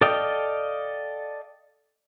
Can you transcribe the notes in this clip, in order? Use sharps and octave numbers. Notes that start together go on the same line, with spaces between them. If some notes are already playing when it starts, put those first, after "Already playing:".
A4 D5 D#5 F5 G5